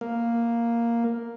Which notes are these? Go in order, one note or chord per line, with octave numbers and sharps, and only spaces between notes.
A#3